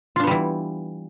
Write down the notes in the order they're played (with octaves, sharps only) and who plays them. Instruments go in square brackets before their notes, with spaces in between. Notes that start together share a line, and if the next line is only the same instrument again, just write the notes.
[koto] F4
D4
B3
G3
E3